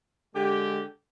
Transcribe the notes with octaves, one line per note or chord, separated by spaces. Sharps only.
D3 G#3 G4